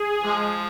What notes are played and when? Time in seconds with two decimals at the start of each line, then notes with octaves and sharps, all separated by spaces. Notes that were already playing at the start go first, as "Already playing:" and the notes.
Already playing: G#4
0.23 F3 G#3 G#4